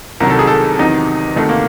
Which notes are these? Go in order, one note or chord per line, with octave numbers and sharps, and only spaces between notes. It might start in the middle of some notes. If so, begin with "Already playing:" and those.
C2 C3 D#3 F#3 A#4
A4
G#4
A4
E2 C3 D#3 F#3 D#4
D2 C3 D#3 A3
A#3